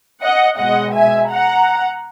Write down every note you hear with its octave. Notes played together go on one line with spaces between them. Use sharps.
D#5 F#5
B2 G#3 D#5 F#5
E5 G#5
F#5 A#5